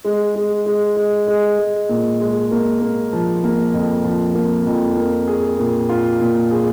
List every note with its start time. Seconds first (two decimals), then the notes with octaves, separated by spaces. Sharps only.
0.04 G#3
0.35 G#3
0.66 G#3
0.96 G#3
1.27 G#3
1.59 G#3
1.89 A#2
2.20 G#3
2.51 A#3
2.81 A#3
3.13 F3
3.44 A#3
3.74 F2
4.04 F3
4.35 A#3
4.66 F2
4.96 A#3
5.28 G#4
5.59 A#2
5.89 F4
6.20 A#2
6.51 G#4